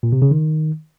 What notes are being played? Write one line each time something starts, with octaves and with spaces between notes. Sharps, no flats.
A#2
C3
C#3
D#3